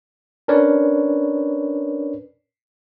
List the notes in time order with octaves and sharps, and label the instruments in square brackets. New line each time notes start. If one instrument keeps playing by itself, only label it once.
[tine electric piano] C#4 D4 A#4 B4 C#5 D5